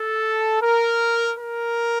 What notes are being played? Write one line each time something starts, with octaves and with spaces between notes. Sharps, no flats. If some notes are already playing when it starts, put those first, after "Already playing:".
Already playing: A4
A#4
A#4